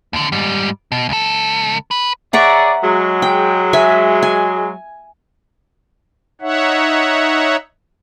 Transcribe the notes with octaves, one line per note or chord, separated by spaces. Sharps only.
D#2 D3
G#2 G3
B2
C#2 A4
B4
G#4 C#5 D5 E5 F#5 A#5
F#3 G#3
G5
E5 G#5
G#5
D#4 C#5 E5 F#5